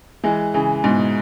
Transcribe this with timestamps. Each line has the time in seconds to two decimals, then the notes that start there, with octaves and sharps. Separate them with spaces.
0.24 E3 G#3
0.54 C#3 E3
0.84 G#2 B2